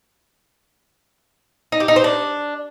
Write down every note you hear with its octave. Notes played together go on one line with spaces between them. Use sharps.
D#4
G4
D#4
C5
D4